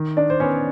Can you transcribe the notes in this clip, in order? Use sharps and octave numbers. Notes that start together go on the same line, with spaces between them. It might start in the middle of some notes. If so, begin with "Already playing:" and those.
Already playing: D#3
D4 D5
C5
B3 C#4 C#5